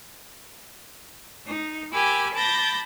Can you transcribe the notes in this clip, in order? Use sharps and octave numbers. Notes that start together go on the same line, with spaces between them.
D#4
G4 A#4 G#5 B5 D6 E6
A5 B5 D6 G6 A6 A#6